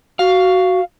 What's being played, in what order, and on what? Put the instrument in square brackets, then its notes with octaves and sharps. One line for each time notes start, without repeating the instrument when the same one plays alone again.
[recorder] F#4 [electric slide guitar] F5